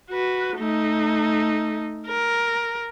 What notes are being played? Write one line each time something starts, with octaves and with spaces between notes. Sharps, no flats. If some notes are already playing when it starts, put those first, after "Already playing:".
F#4 B4
A3 D#4
A#4